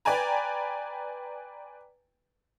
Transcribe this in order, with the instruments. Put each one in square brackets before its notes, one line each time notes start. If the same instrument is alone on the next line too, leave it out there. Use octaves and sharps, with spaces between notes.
[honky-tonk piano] B4 D5 G5 G#5 A#5